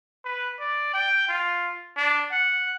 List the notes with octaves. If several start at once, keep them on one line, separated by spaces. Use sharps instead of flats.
B4
D5
G5
F4
D4
F#5